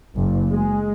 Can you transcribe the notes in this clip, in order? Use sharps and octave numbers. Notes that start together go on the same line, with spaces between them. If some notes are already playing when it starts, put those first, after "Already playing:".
F#1
G#3